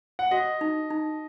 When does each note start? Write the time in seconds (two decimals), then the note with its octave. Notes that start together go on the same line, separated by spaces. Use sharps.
0.19 F#5
0.31 F#4 D#5
0.61 D#4
0.90 D#4